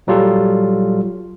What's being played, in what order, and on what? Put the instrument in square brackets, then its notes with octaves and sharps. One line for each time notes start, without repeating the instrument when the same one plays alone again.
[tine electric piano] A#2 F#3 G3 F4 G4 A4